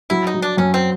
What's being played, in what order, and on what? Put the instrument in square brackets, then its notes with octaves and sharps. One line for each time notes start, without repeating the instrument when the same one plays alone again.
[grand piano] F#3 [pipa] E4
[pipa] D#4
[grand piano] F#3
[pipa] D4
[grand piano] F#2 [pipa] C#4
[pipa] C4